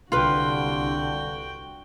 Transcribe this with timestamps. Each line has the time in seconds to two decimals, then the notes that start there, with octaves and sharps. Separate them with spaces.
0.12 C2 D3 F4 F#4 B4 G5